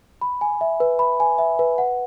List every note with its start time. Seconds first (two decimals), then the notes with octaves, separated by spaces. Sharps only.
0.21 B5
0.41 G#5
0.61 E5
0.80 B4
0.99 B5
1.20 G#5
1.38 E5
1.59 B4
1.78 F#5